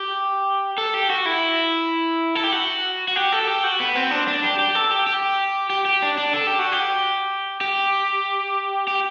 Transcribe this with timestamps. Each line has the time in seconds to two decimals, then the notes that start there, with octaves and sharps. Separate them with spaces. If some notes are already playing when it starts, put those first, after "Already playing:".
Already playing: G4
0.78 A4
0.94 G4
1.10 F#4
1.26 E4
2.35 A4
2.44 G4
2.52 F#4
3.08 F#4
3.16 G4
3.32 A4
3.47 G4
3.64 F#4
3.80 B3
3.95 C4
4.11 D4
4.28 D4
4.44 G4
4.59 G4
4.75 A4
4.91 G4
5.07 G4
5.70 G4
5.85 G4
6.02 D4
6.18 D4
6.34 A4
6.47 G4
6.59 F#4
6.72 G4
7.61 G4
8.87 G4